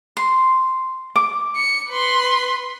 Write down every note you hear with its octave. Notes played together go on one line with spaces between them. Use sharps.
C6
D6
C#7
B4 C6